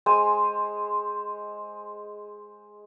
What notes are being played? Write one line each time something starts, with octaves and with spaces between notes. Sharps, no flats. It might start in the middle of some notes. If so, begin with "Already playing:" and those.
G#3 C5 G#5